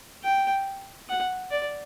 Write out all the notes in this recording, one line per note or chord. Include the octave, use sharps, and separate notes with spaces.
G5
F#5
D5